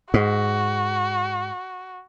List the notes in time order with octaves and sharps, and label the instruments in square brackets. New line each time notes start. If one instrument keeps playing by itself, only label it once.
[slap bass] G#2 [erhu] F#4